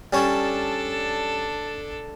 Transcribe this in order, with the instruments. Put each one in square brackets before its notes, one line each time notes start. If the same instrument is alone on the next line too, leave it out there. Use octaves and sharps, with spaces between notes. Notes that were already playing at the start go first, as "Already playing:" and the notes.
[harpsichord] G3 C#4 C#5 [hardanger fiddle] D4 A4